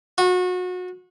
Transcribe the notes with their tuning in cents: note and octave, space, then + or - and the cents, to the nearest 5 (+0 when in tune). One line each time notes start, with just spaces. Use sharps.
F#4 -30